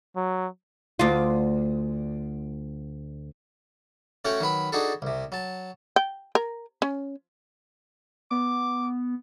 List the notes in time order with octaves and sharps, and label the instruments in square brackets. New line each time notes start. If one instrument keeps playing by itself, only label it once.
[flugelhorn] F#3
[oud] D2 F4
[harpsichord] A3 C#4 F#4 C#5 F#5 G5
D#3 F#3 B4 B5
D4 D#4 F#4 G#4 A4
C2 C3
F#3 A5
[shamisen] G5
A#4
C#4
[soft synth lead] B3 [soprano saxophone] D6